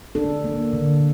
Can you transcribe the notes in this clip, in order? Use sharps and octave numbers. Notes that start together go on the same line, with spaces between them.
D4 A4
A#3
D3